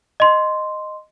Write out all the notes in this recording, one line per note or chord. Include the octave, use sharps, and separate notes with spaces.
D#5 C6